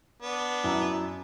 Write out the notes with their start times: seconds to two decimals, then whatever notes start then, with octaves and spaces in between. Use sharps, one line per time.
0.22 B3 D4
0.64 F#2 E4 A#5